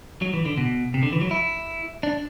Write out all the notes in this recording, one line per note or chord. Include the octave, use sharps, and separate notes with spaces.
F#3
E3
D3
B2
C3
D3
E3
F#3
E4
D4